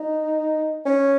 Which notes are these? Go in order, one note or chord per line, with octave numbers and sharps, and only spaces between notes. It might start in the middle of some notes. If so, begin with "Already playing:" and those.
Already playing: D#4
C#4